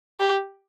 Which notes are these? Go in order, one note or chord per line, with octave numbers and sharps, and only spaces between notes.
G4